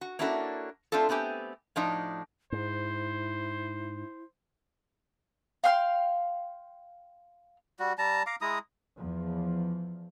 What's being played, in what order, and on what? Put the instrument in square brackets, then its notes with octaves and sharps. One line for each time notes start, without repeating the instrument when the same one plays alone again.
[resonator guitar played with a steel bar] F#4
A#3 C#4 D4 E4 F#4 A4
A3 C4 D4 F4 A4
A3 B3 C4 G4 G#5
A2 F3 D4 D#4
[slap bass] G#2 [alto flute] E4 [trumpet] C5
[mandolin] F5 G5 C6 F6
[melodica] G3 F#4
G3 A5 A#5
F5 A#5 D6
G#3 E4 A#5 D#6
[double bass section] E2 F3